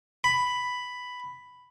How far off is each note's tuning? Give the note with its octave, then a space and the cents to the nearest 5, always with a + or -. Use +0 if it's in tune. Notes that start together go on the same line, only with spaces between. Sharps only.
B5 +5